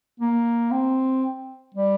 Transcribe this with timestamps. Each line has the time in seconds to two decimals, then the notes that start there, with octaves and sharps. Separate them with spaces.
0.20 A#3
0.71 C4
1.74 G3